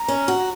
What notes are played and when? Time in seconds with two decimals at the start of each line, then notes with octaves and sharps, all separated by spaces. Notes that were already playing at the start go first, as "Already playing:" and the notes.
Already playing: A#5
0.08 C#4
0.28 F#4